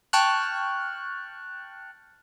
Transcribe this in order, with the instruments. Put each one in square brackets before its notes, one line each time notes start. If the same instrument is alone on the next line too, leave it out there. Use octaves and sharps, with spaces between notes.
[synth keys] G5 A5 C#6 F6 F#6